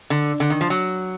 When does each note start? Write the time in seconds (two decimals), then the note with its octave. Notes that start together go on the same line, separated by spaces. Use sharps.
0.10 D3
0.40 D3
0.50 D#3
0.61 F3
0.70 F#3